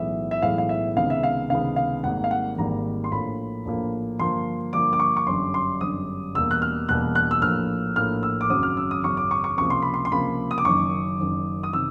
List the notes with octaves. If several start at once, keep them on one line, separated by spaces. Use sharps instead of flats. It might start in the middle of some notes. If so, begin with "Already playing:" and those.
Already playing: B1 A2 E3 G#3 B3 E5
E5
B1 A2 E3 G#3 B3 F5
F5
E5
C#2 C3 D#3 G#3 B3 F5
E5
F5
C#2 C3 D#3 G#3 B3 F5
F5
G#1 G#2 D#3 G3 A#3 F#5
F5
F#5
G#1 G#2 D#3 G3 A#3 A#5
C6
A#1 A2 F3 A#3 B5
A#1 A2 F3 A#3
G2 D3 F3 A#3 C6
G2 D3 F3 A#3 D6
D6
C#6
C#6
G1 F#2 D3 G3 C6
C6
G1 F#2 D3 G3 D#6
E1 E2 B2 G3 A#3 E6
F#6
F6
E1 E2 B2 G3 A#3 F#6
F#6
E6
A#1 A2 F3 A#3 F6
A#1 A2 F3 A#3 F6
E6
D6
G#1 F#2 C#3 F#3 D#6
F6
E6
D#6
G#1 F#2 C#3 F#3 C#6
D6
C#6
C#6
C#2 C3 F3 A#3 C#6
C6
B5
C6
C6
C#2 C3 F3 A#3 B5
D#6
D6
F#1 F#2 D#3 C#6
F#1 F#2 D#3
D#6
C3 D#3 E6